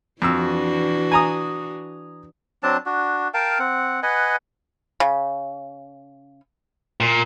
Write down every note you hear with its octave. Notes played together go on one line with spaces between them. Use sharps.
F2 E3 D4 F#4 E6
G#5 A#5 D#6
F#3 C4 D4 A5
D4 F#4
A#4 F5 G5 A5
C4 F#5
B4 D#5 F#5 G#5
C#3
A#2